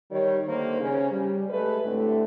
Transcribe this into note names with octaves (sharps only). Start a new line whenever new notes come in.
D#3 G3 C#5
D3 D#3 A#3 C5
C#3 C#4
G3
G#3 A3 B4
A2 D3 A3 C4 G4 A4